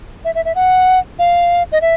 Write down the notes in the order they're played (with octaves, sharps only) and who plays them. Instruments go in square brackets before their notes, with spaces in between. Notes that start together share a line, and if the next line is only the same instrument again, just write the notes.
[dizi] E5
E5
E5
F#5
F5
D#5
E5